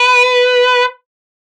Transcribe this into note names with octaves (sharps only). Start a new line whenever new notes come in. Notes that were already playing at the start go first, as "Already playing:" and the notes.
Already playing: B4